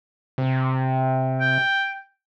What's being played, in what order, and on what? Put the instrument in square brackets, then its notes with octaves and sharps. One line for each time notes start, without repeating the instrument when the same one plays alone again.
[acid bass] C3
[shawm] G5